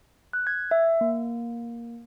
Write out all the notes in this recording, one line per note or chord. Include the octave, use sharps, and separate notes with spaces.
F#6
G#6
E5
A#3